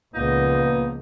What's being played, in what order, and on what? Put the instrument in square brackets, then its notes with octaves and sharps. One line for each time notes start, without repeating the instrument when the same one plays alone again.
[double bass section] C#2 F3 [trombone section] A#2 B3 [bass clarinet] A#3 [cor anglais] D#4